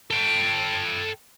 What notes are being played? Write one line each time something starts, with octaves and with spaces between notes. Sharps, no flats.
A4 G5